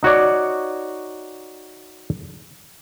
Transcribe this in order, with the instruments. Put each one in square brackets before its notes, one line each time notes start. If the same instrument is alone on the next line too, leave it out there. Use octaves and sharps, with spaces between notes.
[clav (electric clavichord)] D#4 F#4 C#5 D5